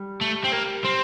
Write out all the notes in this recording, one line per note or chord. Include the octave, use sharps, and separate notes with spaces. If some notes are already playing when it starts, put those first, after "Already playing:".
Already playing: G3
A3
C4
A#3
C4